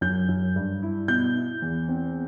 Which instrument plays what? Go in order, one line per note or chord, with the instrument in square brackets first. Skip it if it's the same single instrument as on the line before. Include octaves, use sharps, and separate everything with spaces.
[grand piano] F#2 G6
F#2
G2
E4
B2 G6
E4
E2
C4